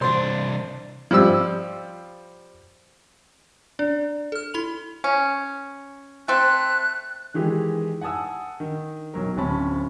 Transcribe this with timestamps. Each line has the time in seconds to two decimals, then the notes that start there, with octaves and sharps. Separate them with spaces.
0.01 C2 D4 C5 C6
1.11 F3 G3 C4 E6
3.79 D4 D5
4.32 A4 F6
4.54 E4 B5 F7
5.04 C#4
6.28 A3 C4 F#6
7.34 D#3 E3 G#3 G4
8.01 F#5 G#5 A5 D#6 E6
8.60 D#3
9.14 B1 F#3 A#4
9.37 D1 C4 C#4 A5 B5